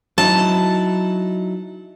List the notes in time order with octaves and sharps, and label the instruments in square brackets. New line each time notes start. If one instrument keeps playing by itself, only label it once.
[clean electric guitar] F#3 D#4 E4 [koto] A5